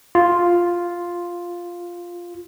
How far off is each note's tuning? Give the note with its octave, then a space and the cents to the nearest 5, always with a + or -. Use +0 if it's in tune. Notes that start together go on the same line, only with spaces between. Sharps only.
F4 +0